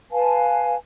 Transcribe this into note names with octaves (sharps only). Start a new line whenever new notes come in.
B4 F5 G#5 A5